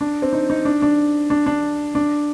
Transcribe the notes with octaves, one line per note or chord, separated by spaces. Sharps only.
D4
C4
D#4
D#4
D4
D4
D4
D4
D4